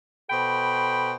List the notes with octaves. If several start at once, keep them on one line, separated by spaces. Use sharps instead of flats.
B2 A4 C5 G5 B5